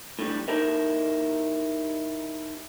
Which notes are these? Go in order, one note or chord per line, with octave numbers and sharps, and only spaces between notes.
A2 D3 G3
D#4 E4 G4 A4 A#4 D#5